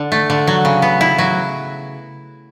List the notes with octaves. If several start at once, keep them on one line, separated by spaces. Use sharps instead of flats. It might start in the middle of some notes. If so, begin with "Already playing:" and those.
Already playing: D3 D4
A3
D3
F#3
C#3
B3
E4
F#3